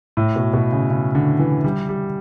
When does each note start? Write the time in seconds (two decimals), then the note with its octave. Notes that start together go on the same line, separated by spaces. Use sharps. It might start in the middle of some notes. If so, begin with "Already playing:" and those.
0.17 A2
0.36 B2
0.53 B2
0.72 C#3
0.90 C#3
1.15 D3
1.39 E3
1.64 G3
1.89 G3